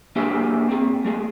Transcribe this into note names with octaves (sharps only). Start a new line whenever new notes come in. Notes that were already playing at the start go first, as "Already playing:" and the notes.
A#3 D4 G4 G#4 C5 E5
C4 G#4
A3 A#3 G#4